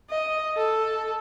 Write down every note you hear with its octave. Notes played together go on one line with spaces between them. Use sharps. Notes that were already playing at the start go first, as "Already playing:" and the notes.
D#5
A4